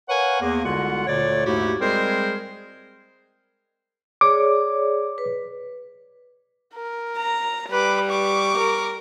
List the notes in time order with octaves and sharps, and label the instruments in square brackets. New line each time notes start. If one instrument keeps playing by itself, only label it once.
[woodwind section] A#4 B4 C#5 F5 F#5 G#5
E2 A#3
C2 D3 G#3 F4 F#4 F#5
D2 A#2 D3 A3 C#5 D5
D#2 G#2 A3 E4 F#4 G4
G3 G#3 C4 G#4 A#4 C5
[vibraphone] G#4 C#5 D5 [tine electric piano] D6
[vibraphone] B4
[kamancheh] A#4
[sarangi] A#5
[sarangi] G3 [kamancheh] B4 D6
[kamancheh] C#6 D6
[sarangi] A#4